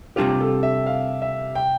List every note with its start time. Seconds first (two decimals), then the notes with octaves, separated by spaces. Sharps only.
0.16 C3 G3 D4 F4 G4
0.40 A4
0.63 E5
0.86 F5
1.22 E5
1.55 G5